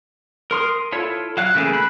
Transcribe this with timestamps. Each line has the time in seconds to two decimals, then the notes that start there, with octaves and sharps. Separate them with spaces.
0.51 A#4 C6 D#6
0.92 E4 F4 A4 C#5
1.37 F#3 F5 F#6
1.55 C#3 E3 A3 A#3 G#4
1.73 B5 F#6